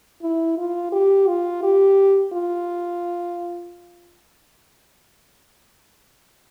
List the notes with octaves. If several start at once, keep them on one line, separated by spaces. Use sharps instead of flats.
E4
F4
G4
F4
G4
F4